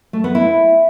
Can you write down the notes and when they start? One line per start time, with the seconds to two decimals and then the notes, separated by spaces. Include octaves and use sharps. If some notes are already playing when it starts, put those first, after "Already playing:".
0.13 A3
0.24 B3
0.35 E4